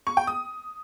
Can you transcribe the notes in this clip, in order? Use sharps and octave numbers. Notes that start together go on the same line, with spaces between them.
C#6
G5
D#6